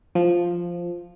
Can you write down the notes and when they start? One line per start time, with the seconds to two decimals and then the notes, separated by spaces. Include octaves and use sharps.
0.15 F3